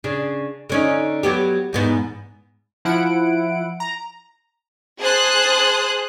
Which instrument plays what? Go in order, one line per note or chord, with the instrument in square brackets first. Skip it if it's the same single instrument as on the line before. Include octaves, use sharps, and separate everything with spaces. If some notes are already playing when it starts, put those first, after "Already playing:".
[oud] C#3 D4
D3 C#4 D#4
F#3 B3 G4
E2 G#2 B3
[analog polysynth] F3 E4 F#5 D7
A#5
[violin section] G#4 C5 A5 C6 D#6 F#6